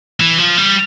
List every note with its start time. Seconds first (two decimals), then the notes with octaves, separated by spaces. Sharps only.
0.20 E3
0.38 F3
0.57 G3